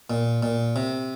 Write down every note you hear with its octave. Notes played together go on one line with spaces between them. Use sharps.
A#2
A#2
C3